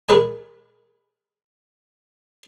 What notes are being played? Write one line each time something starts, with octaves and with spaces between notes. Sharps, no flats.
G#4 A#4 B4 D#5 G#5